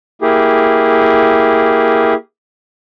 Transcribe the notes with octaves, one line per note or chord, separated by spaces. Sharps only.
A#3 E4 G4 G#4